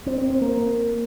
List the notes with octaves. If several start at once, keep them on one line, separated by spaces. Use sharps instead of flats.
C4
C4
C4
A#3